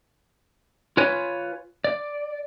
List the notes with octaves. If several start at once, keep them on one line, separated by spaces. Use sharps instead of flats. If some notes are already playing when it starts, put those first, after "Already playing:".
F4 B4 C#5 G#5
D5